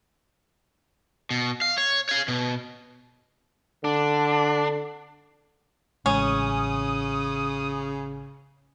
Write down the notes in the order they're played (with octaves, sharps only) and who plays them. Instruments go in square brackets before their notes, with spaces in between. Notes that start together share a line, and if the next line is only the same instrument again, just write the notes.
[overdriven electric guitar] B2
F5
C#5
C#5 F5
B2
[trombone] D3 [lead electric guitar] D4
[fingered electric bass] A1 G#3 [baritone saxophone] C#3 [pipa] C#4 [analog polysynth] D#6